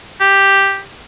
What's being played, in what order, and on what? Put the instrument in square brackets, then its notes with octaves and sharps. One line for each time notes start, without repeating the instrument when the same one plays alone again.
[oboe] G4